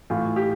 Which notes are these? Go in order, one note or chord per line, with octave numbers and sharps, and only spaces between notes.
A2 E3 F4
G4